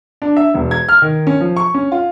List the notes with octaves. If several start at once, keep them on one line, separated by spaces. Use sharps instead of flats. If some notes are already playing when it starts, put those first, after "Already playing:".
D4
E5
E1
G#6
F6
D#3
C#4
F3
C#6
C#4
F4